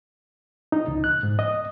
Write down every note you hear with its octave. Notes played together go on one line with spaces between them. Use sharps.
D#4
C#2
F#6
G#2
D#5